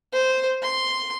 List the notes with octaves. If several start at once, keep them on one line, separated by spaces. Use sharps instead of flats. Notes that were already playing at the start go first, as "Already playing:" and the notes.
C5
C6